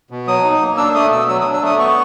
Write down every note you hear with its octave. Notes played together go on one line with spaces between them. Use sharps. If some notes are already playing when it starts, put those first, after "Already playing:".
B2
F#3 D#6
D#4
A#3
D4 E6
A3 D#6
B2 E6
F#3 E6
D#6
D4
E6
A3 D#6
B3 C#6